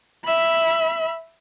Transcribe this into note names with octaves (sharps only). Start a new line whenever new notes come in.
E5 B5